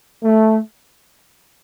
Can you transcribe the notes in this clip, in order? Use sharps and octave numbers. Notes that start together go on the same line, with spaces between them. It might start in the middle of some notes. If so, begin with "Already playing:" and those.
A3